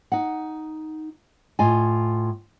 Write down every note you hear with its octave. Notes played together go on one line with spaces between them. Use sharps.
D#4 F#5
A2 F4 D#5 G#5